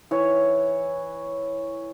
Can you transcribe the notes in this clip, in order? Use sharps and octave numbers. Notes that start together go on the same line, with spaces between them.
E3 C#5 D6